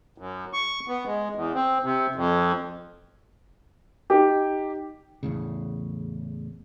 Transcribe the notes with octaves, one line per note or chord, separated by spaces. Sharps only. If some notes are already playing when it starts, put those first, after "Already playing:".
F#2
C#6
B3
G#3
E2
C4
C3
F2
D#4 G4
E2 A2 C#3